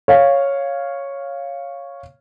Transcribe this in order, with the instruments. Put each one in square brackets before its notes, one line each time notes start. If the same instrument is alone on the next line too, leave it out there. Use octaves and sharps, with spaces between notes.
[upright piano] C#5 F5